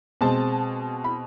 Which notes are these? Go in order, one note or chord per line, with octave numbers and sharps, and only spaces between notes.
B2 G#3 C4 A5
B5